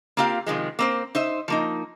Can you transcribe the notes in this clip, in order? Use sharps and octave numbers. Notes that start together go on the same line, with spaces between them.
A#3 C4 F4 G4 F5
C3 D#3 F3 G#3
A#3 C4 C5
D#4 C5 E5
F3 A#3 D#4